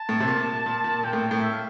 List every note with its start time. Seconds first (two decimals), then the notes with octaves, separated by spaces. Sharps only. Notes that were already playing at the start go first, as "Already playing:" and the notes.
Already playing: A5
0.09 A2
0.20 C3
0.28 A#2
0.66 A#2
0.84 A#2
1.04 A#2 G5
1.13 A2
1.31 A2
1.41 E5
1.53 F5